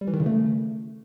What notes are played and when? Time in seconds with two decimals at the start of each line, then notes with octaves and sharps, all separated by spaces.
0.01 G3
0.07 E3
0.14 D#3
0.20 C#3
0.26 A3